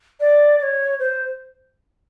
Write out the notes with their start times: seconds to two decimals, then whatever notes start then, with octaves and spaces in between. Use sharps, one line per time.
0.20 D5
0.59 D5
0.63 C#5
0.99 C5